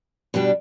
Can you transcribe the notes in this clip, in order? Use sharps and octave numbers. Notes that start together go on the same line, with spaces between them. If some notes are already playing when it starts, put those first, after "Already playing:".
B2 G3 D4 G4